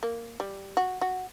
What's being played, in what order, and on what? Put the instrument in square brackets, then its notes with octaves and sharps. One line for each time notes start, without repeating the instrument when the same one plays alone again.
[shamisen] A#3
G3
F#4
F#4